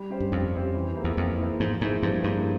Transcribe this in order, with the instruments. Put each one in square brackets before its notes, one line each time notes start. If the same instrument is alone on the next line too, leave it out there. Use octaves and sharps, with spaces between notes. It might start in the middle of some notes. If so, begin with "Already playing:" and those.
Already playing: [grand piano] G3
C#4 G4 C5
[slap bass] G2
[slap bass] F2 [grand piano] G3
[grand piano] C#4 G4 C5
E3
A#3 E4 G#4 C5
[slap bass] E2
[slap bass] F2 [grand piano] E3
[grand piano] A#3 E4 G#4 C5
[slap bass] G#2 [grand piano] F3
[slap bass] G#2 [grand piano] A#3 E4 G#4 C5
[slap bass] G2 [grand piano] F3
[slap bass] G2 [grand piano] A#3 E4 G#4 C5